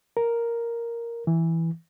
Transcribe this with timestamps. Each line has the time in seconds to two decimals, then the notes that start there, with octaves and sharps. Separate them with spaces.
0.17 A#4
1.27 E3